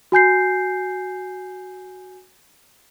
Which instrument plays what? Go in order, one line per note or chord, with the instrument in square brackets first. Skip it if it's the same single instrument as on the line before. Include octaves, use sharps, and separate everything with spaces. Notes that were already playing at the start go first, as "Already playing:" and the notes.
[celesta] F#4 G#5 G6 C7